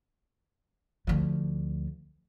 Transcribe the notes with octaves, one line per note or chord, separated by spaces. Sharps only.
D2 F3